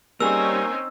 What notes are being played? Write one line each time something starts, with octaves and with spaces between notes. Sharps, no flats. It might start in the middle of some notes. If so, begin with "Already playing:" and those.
G3 A#3 C4 C#4 D#4 G#4 E6